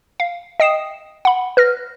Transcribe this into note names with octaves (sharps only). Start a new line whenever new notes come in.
F5
D#5 G5 D#6 C7 E7
F#5 B5
B4 F6 A#6